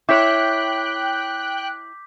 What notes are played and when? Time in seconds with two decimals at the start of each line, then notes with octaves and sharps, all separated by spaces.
0.09 E4 C#5 G5 D6 F#6 G6 B6